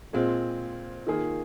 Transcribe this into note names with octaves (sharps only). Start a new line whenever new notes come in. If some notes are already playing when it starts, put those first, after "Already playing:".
A#2 G#3 C4 F4
D#3 A#3 F4 G#4